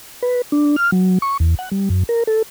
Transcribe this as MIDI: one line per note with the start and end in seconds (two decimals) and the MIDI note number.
0.22 0.42 71
0.52 0.76 62
0.76 0.91 89
0.92 1.18 54
1.22 1.37 85
1.40 1.55 40
1.59 1.69 78
1.71 1.89 55
1.90 2.03 42
2.09 2.23 70
2.27 2.42 69